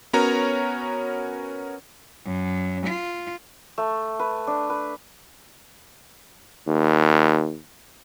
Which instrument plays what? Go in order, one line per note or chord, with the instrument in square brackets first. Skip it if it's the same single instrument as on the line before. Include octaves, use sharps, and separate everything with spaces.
[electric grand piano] B3 C#4 F#4 A#4 C#5 A#5
[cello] F#2
F4
[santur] A3
B4
D4
B4
[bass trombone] D#2